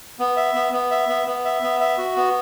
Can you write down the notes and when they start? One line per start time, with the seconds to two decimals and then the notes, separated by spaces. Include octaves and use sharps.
0.19 B3
0.37 E5
0.55 B3
0.72 B3
0.91 E5
1.09 B3
1.27 B3
1.45 E5
1.63 B3
1.80 E5
1.98 F#4
2.17 B3